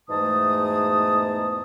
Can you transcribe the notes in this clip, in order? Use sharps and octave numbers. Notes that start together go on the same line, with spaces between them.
E2 G#2 B2 A3 A5 D#6